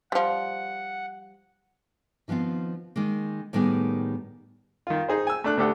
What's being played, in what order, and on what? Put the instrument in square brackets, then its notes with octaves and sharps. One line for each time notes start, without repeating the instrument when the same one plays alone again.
[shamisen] F3 G3 [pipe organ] F#5
[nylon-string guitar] D#3 F3 B3 C4 F4
D#3 G#3 A#3
A2 D#3 G3 A#3 B3 G#4
[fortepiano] D#3 F4
D#4 G#4 C5
G#5 E6
A3 D4 F#6
D2 A3 D4 G4 A4 F#5